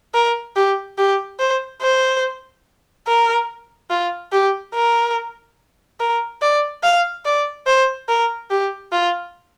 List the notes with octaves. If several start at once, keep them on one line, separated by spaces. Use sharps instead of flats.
A#4
G4
G4
C5
C5
A#4
F4
G4
A#4
A#4
D5
F5
D5
C5
A#4
G4
F4